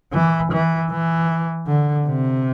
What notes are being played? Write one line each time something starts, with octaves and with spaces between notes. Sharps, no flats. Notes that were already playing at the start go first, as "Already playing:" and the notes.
E3
E3
E3
D3
C3